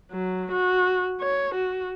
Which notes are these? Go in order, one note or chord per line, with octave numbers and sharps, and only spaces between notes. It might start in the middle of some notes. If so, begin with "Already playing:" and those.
F#3
F#4
C#5
F#4